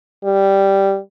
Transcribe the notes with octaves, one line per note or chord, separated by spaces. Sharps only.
G3